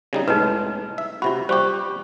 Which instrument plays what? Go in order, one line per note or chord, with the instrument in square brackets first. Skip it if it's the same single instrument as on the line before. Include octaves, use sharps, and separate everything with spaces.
[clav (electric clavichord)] C#3 G3 D#4
[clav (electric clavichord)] C2 A2 G#3 [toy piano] D#4 B4
[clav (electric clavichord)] E5
[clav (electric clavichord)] C3 F#4 [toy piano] F4 B5
[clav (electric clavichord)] G3 G4 [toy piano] C5 C#6